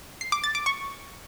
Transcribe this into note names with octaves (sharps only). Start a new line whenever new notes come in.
C7
D6
A6
D6
C#6